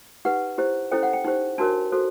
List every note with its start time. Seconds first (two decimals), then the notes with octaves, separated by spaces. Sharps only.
0.25 D#4 G4 B4 F#5
0.58 E4 G4 C5
0.91 C#4 E4 A4 C5 G5
1.03 F#5
1.13 G5
1.25 D#4 G4 C5
1.58 D4 F#4 A#4 C#5 A5
1.92 F#4 A4 C5